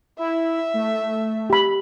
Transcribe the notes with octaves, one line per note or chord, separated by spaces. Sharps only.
E4 E5
A3
G4 B5